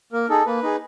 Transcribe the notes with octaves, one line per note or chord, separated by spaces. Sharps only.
A#3 A#4
D#4 G#4 A4
A#3 B4
D#4 G#4